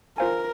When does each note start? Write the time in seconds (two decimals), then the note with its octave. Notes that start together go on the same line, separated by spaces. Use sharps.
0.18 F4 A#4 C5 F5 G#5